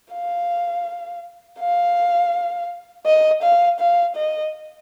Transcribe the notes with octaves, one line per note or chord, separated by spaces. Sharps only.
F5
F5
D#5
F5
F5
D#5